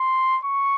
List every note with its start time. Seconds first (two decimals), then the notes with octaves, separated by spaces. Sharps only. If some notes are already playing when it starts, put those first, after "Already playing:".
Already playing: C6
0.44 C#6